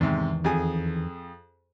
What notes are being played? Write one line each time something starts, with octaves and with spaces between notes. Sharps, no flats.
E2 G#2 C3 D#3
F2 G#4 G#5